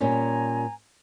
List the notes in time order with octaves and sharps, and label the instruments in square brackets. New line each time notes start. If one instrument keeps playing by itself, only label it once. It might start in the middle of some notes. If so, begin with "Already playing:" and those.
[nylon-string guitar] A#2 G3 C#4 [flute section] G#5 A#5